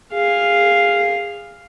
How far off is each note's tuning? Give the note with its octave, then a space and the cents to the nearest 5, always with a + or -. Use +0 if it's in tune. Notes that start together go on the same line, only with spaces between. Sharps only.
G#4 -25 F5 +0